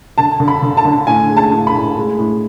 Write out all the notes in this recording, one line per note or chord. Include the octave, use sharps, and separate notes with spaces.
D3 A5
D3
B5
D3
A5
D3
A2 G#5
G#3
A5
A2
B5
A2
G#3
A2